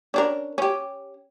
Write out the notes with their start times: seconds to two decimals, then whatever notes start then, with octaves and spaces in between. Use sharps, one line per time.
0.14 C#4 D4 A#4
0.58 C#4 G4